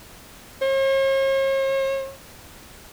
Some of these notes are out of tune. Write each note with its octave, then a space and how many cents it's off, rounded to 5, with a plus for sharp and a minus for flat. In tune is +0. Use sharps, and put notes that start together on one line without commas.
C#5 -45